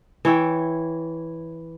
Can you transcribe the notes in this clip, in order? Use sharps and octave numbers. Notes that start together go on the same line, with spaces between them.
E3 C#5 E5 G5